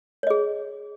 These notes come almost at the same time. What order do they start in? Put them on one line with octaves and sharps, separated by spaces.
C#5 D#5 G#4